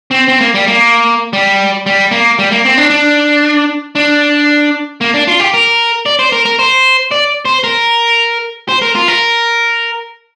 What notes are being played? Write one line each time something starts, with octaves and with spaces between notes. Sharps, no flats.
C4
C4
A#3
G3
A#3
G3
G3
A#3
G3
A#3
C4
D4
D4
D4
A#3
D4
F4
G4
A#4
D5
C5
A#4
A#4
C5
D5
C5
A#4
C5
A#4
F4
A#4